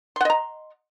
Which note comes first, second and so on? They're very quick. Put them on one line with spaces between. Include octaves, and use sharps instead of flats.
C6 F#5 D#5 A#5